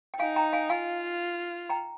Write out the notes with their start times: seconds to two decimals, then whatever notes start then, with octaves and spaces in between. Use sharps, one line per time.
0.14 G5
0.19 D#4 F5 G#5
0.36 G5 A#5
0.53 F5 G#5
0.70 F4 F5 G#5
1.69 G5 A#5